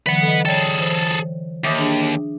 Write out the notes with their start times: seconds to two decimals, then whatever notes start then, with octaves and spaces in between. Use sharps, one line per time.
0.06 D3 E3 F#3 B4 F#5
0.22 A4 D#5
0.45 G#4 A4 C#5 D5 G5
0.78 E3 C5
1.64 D#2 E5 D6 D#6
1.78 D4 G#4